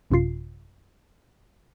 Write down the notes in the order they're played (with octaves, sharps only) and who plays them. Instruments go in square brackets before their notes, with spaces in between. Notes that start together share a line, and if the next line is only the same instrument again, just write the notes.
[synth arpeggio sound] A1 F#2 C3 F4 C7